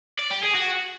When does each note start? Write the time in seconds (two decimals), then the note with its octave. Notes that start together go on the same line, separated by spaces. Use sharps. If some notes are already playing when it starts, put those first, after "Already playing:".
0.19 D5
0.31 G4
0.43 G#4
0.55 F#4